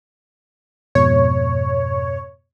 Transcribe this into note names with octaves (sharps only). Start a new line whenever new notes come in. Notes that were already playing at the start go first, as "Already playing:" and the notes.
F2 G#2 B2 C#5